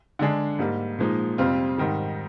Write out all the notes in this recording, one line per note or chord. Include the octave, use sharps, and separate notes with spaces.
D3 G#3 D4 G#4
G#2 G3 A#3
A#2 F3 G#3 D#4
F2 C3 G3 C4 F4
G#2 D#3 G3